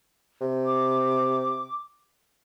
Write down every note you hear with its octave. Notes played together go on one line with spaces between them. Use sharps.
C3
D6